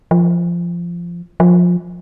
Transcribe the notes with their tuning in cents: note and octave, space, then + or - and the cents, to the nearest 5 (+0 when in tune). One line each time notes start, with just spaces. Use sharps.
F3 -15
F3 +20